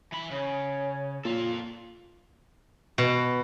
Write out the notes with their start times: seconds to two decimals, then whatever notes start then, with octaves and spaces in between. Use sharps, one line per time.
0.12 E3 B5
0.31 C#3 C#5
1.25 A#2 F4 A4
2.98 B2